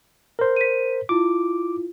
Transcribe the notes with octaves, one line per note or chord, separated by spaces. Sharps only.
A#4 C5
B6 D#7
E4 F4 D6